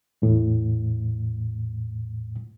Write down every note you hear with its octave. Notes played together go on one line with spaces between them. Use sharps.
E2 A2